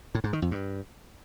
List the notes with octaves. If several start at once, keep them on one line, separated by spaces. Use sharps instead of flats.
A2
G#2
D#3
F2
G2